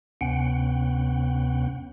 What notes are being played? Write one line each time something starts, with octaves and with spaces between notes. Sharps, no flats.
D2 C3 B3 C#4 F#5 G5